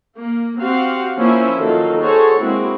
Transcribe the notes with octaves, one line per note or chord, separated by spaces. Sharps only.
A#3
C4 F#4 G4 F5 F#5
F3 A#3 C#4 E4 C5 E5
D#3 F#3 A#3 F4 A4
F#4 G#4 A4 C5 C#5
G#3 A#3 C4 E4 F#4